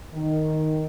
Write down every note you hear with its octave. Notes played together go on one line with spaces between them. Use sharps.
D#3